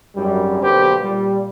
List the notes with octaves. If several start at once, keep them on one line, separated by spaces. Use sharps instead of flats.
G#1 F#2 G3
B1 D3 A#3 G4 B4 C5
A#2 G3